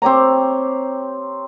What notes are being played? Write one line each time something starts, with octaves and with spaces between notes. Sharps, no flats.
C4 G4 C#5 A#5